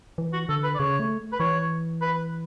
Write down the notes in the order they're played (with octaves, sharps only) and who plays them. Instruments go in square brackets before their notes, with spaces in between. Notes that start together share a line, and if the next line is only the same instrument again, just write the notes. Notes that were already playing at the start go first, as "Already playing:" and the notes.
[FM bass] E3
[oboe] F#4
[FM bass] D3 [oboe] A4
[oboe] B4
D5
[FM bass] C#3 [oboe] C#5
[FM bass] A3
[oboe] B4
[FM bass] E3 [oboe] C#5
[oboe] B4